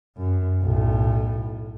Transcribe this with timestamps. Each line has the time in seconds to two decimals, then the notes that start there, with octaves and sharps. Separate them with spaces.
0.18 F#2
0.62 B1 A2